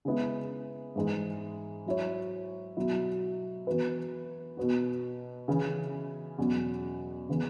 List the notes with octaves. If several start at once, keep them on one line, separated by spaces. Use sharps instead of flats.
C#3 G#3 B3 E4
G#2 E3 G#3
F#3 E4 C#5
B2 F#3 E4
E3 B3 F#4 B4
B2 B3 F#4
C#3 E3 C#4
E2 B2 F#3 C#4
C#3 E3 B3